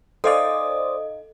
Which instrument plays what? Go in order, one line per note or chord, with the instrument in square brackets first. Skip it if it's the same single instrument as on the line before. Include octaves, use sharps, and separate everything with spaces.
[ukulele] D#4 F5 G#5 [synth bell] A4 D#5 [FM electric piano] C5 D5 [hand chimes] D#6